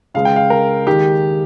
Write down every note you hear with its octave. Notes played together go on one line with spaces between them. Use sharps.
C#2 C#3 G#3 F5
G5
F5
A#4
D#2 D#3 G#3 D#4 G4